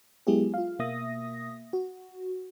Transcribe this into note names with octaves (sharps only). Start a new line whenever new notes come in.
F#3 G#3 B3 E4 G4 G#4
F4 F5
B2 A#3 E5 D#6 A#6
F#4